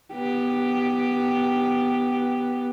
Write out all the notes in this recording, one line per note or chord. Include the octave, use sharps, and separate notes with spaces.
B3 G4